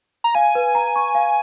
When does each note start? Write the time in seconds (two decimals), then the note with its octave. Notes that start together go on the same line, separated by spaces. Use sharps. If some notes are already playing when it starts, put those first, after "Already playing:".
0.24 A#5
0.35 F5 G#5
0.55 B4
0.75 A#5
0.96 C#6
1.15 F5